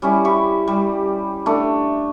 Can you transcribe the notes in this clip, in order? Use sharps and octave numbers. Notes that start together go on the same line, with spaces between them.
G3 C#4 E4
E4 G4 C#6
G3
A3 D4